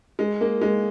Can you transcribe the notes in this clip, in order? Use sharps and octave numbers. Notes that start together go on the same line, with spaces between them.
G#3
A#3
G#3